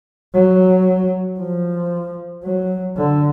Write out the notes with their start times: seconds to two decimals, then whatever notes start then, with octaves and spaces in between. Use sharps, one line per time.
0.34 F#3
1.39 F3
2.45 F#3
2.97 D3